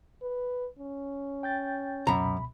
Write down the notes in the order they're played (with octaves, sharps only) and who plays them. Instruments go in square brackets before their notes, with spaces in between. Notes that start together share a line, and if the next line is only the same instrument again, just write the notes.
[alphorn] B4
C#4
[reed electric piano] G5 G6 A6
[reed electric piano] C#2 B2 B5 [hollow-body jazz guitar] F#2 A#5